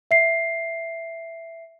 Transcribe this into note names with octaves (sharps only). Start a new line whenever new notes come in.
E5 C7